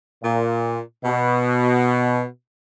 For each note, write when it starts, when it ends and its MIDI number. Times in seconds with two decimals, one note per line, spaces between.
0.23 0.79 46
1.05 2.25 47